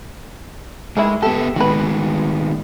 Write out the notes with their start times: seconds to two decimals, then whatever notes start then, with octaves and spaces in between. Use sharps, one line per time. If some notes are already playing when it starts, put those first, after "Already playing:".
0.97 D#3 E3 G#3 E4
1.22 B3 G4 A4
1.56 D#3 G#3 B3 F#4 B4